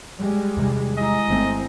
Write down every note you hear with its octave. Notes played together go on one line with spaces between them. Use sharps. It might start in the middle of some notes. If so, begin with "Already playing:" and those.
G3 G#3
E2 C3 D#3
G#3 E4 D#5 A#5
G1 D#3 A3 C4